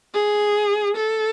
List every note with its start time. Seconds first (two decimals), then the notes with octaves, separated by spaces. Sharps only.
0.13 G#4
0.96 A4